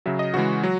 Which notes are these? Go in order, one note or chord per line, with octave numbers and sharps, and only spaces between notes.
C#3 F#3 E5
D#5
C#3 E3 G#3 F#4
F#3